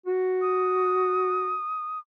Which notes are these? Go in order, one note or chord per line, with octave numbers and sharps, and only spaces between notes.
F#4
D#6